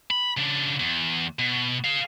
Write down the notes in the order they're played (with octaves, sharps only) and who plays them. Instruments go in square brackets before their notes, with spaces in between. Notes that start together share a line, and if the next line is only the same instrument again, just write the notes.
[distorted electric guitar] B5
C#3 D4
E2
B2
G#4 F5